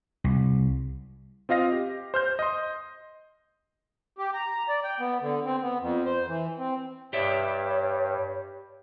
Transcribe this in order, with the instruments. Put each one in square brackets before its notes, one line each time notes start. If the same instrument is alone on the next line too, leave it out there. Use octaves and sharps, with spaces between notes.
[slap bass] C2
[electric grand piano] C4 F4 D#5 F5 A#6
G4
C5 F6 G6
D#5 C6
[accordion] G4
A#5
D5
G5
B3
D3
C4
B3
F2
C5
E3
C4
[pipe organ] G2 [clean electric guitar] G4 D5 E5 [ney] C#5